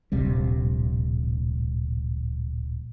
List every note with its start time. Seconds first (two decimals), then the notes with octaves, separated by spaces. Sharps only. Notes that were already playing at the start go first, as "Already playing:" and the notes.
0.12 D1 A#1 C3 G3